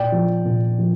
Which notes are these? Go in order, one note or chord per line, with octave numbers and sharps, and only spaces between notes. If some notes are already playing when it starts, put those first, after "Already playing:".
Already playing: A#2 D5 G5
F3
A#2
F3